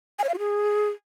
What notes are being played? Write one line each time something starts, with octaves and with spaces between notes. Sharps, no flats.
G#5
C#5
F5
F#4
G#4